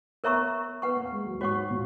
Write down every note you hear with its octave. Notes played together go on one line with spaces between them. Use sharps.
B3 A#4 C#5 E5 A#5 C#6
B3 B4 F#5 C#6
A#3
G#3
F#3
G#2 F#4 C#5 F#5 C#6
A#2